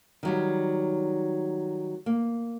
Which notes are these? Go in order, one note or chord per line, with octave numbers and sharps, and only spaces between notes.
D#3 F#3 G3
A#3